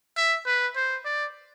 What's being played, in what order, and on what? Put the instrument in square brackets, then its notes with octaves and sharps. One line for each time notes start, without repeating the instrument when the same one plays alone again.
[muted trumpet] E5
B4
C5
D5